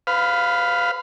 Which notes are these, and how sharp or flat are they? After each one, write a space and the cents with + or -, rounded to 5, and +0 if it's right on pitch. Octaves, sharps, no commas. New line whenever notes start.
B4 +35 F5 +0 B5 +0